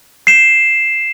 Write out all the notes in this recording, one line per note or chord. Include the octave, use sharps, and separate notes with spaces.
C7 E7